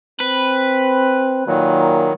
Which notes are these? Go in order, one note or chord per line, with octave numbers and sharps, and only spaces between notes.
C4 B4
A#2 D#3 F#3